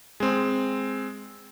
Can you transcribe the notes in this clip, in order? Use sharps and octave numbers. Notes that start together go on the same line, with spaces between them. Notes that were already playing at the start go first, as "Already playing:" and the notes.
G#3 C4